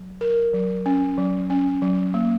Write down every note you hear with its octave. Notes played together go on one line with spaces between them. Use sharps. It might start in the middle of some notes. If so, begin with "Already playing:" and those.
Already playing: F#3
A#4
F#3
C#4
F#3
C#4
F#3
A#3